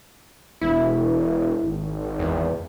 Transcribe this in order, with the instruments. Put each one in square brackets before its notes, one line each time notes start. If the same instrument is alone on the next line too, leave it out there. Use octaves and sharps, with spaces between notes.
[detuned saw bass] E1 [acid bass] E4
[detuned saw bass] G#1
[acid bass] E2